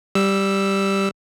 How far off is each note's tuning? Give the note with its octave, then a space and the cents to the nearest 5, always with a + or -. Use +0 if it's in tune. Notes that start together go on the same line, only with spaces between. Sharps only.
G3 +0 E6 +0